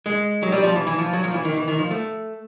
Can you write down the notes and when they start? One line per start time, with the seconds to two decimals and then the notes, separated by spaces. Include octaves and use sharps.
0.06 G#3
0.43 F#3
0.52 G3
0.64 F3
0.76 E3
0.87 E3
0.98 F3
1.13 F#3
1.24 F3
1.34 E3
1.45 D#3
1.56 E3
1.68 D#3
1.79 F3
1.91 A3